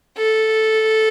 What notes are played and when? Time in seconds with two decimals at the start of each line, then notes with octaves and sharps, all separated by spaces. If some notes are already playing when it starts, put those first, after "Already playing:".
0.17 A4